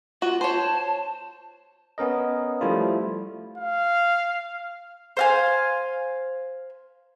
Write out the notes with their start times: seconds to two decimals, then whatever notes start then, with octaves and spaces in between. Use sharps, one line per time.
0.22 F4 F#4
0.41 C5 C#5 A5
1.98 B3 C#4 A#4 D#5
2.61 F3 G3 A3 E4 F4
3.58 F5
5.17 C5 F5 G#5